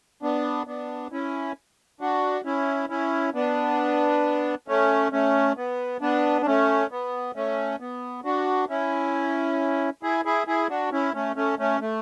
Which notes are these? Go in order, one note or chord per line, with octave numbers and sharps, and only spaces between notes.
B3 D4
B3 D4
C#4 E4
D4 F#4
C#4 E4
C#4 E4
B3 D4
A3 C#4
A3 C#4
B3
B3 D4
D4
A3 C#4
B3
A3 C#4
B3
D4 F#4
C#4 E4
E4 G#4
E4 G#4
E4 G#4
D4 F#4
C#4 E4
A3 C#4
A3 C#4
A3 C#4
A3